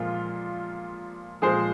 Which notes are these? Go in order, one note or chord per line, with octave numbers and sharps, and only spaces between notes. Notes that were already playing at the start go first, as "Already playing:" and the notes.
Already playing: A#2 F3 G#3 F4 A#4
A#2 F3 G#3 G#4 C5